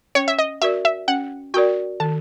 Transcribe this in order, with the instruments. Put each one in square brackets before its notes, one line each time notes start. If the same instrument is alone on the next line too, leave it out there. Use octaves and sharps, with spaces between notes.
[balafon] C#4 [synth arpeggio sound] C#5
[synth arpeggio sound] E5
D#5
[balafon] F#4 A#4 D5 [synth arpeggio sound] E5
[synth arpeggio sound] E5
[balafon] C#4 [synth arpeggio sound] F#5
[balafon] F#4 A#4 D5 [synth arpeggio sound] G5
[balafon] D#3 [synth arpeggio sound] A5